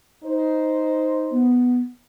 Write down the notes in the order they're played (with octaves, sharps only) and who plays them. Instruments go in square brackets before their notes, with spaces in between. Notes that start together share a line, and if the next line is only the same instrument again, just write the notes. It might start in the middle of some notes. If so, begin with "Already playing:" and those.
[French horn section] D#4 C5
[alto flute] B3